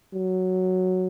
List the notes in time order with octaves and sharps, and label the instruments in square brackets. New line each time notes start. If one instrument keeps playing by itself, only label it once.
[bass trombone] F#3